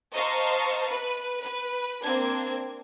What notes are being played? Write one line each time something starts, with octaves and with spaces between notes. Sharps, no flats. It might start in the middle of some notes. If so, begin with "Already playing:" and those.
C5 D#5 F5 A5 A#5 C#6
B4
B4
A#3 C4 D4 G#6